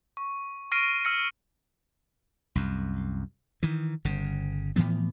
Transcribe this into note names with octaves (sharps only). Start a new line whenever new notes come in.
C#6
C#6 F6 A#6 C7 D7 D#7
E6 F6 A#6 C#7
C2 F#2
D#3 E3
G1 C#3
A2 E3 F3 B3